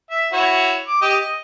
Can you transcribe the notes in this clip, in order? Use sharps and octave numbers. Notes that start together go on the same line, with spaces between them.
E5
E4 F#4 C#5
D6
G4 D#5
D#5